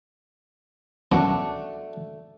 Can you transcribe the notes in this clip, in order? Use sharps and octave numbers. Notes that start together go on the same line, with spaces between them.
F#2 B2 F#3 A3 D4 F#4